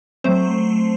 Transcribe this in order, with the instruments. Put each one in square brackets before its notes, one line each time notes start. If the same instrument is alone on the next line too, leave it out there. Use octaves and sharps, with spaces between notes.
[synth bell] F#3 A3 C4 C5